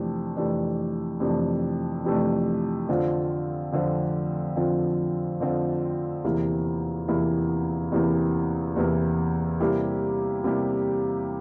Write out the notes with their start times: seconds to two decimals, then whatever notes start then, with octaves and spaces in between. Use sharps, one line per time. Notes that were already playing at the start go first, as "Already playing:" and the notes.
Already playing: F2 C3 E3 A3 D4
0.37 F2 C3 E3 A3 D4
1.20 F2 C3 E3 A3 D4
2.05 F2 C3 E3 A3 D4
2.89 F2 D3 F3 C4 F4
3.73 F2 D3 F3 C4 F4
4.56 F2 D3 F3 C4 F4
5.40 F2 D3 F3 C4 F4
6.24 E2 C3 E3 A#3 E4
7.08 E2 C3 E3 A#3 E4
7.92 E2 C3 E3 A#3 E4
8.76 E2 C3 E3 A#3 E4
9.60 C3 G3 A#3 E4 G4
10.44 C3 G3 A#3 E4 G4